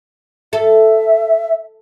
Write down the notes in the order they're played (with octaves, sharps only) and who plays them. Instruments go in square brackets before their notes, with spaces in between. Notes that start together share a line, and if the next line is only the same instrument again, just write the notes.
[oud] A4 [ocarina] E5